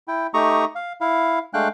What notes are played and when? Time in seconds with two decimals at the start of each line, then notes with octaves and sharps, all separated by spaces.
0.08 E4 G5
0.34 A3 D#4 G4 A#5 C#6 D#6
0.75 F5
1.01 E4 F5
1.54 G#3 A3 D4 F5 G5 F#6